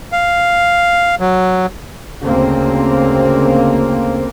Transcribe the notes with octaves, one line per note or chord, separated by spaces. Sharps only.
F5
F#3
D2 C#3 A#3 C4